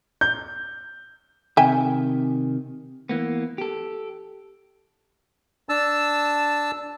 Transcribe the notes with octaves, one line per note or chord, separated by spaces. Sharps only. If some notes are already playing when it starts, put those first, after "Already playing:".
G6
C3 D#3 E5 G5 G#5
E3 A#3 B3
G4 A4
D4 A5 E6